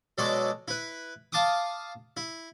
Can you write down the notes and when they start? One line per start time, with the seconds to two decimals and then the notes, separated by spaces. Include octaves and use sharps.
0.18 B2 F#3 G#3 A4 D5 D6
0.68 E4 B4
1.32 F5 A5 C6 D6 D#6
2.17 E4